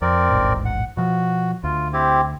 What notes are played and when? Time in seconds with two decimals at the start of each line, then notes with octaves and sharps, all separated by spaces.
0.02 F2 C4 A#4 D5
0.31 D#1 A1 G#2
0.65 F#5
0.97 B2 F3 F#4
1.64 D2 F4
1.93 C4 E4 G4